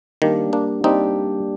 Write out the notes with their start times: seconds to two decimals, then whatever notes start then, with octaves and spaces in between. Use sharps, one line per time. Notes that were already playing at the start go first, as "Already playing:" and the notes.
0.22 D#3 G3 A#3 D4 G4
0.53 A#3 D4
0.84 G3 A#3 C4 D4 D#4 G4